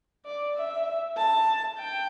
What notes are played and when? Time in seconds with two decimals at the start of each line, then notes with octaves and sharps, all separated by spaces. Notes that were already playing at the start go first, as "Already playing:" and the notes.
0.25 D5
0.55 E5
1.17 A5
1.79 G5